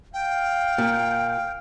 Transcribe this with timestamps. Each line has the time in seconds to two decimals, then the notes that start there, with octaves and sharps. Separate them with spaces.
0.14 F5 G5
0.78 A#2